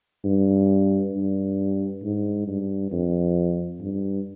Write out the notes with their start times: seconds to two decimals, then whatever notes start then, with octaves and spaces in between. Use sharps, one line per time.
0.25 G2
1.13 G2
2.03 G#2
2.47 G2
2.92 F2
3.81 G2